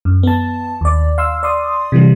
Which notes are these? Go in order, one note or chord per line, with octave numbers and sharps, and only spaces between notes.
F#2
B3 A5
D#2 D5
F5 C6 E6
D5 C6 D#6
C3 E3 G3